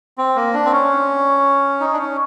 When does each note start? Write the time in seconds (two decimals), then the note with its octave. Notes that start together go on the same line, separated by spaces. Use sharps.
0.18 C4
0.36 A#3
0.54 D4
0.65 C4
0.72 C#4
1.80 D#4
1.93 D4
1.98 C#4